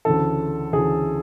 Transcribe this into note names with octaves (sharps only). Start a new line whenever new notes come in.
D2 C#3 E3 A4
D2 C#3 E3 G#4